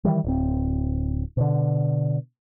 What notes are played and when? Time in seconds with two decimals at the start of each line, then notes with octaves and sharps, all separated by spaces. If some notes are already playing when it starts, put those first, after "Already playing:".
0.04 D#3 E3 G3
0.24 D1 C4
1.37 B2 D3